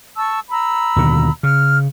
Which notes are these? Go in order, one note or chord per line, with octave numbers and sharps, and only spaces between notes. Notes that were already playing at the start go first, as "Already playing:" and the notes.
A5 C#6 E6
A#5 B5 E6
D#2 B2 D3
C#3 F6